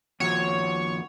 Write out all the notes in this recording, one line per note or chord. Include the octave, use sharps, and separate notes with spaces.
D#2 F3 F#4 C#5